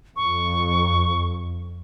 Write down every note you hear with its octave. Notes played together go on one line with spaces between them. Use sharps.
F2 C#6